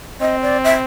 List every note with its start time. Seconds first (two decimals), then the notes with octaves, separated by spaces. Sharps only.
0.21 C4 D#5
0.42 D5
0.64 E5